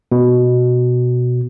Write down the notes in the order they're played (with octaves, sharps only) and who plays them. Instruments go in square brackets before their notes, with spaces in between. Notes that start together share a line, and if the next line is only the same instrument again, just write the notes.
[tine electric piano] B2